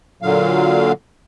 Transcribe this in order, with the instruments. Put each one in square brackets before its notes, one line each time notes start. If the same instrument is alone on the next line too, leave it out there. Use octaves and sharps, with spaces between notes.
[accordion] A#2 D3 F#3 F5